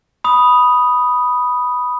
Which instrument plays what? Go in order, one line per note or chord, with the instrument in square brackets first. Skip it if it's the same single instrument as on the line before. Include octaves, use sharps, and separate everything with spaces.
[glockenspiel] B5 D#6